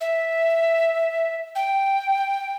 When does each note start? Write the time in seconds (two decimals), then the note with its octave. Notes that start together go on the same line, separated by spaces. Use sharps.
0.01 E5
1.55 G5